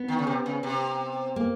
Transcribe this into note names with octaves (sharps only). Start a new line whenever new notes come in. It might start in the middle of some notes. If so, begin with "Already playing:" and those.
Already playing: B3
D#3
C#3
C3
C#3
C3
A#3